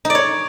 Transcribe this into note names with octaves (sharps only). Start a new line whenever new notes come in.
D#4
D5
C#5